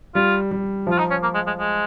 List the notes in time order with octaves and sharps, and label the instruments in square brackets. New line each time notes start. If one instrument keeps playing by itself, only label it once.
[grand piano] G3 [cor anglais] F4
[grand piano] G3
[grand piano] F3 [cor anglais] F4
[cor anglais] D#4
C#4
A#3
G#3
G#3
G#3